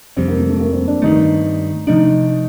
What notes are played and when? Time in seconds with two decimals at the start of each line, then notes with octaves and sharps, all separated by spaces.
0.16 F2 C3 G3 C4
0.28 A#3
0.39 A3
0.49 A3
0.60 A#3
0.73 C4
0.87 D4
1.02 G2 D#3 A3 D#4
1.87 C3 F3 A3 D4 D#4